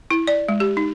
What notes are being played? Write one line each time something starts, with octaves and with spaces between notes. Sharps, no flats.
E4
D5
G#3
G4
D#4